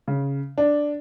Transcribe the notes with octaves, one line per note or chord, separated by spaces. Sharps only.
C#3
D4